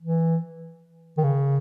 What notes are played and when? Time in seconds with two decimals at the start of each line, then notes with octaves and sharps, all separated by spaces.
0.01 E3
1.18 D#3
1.24 C#3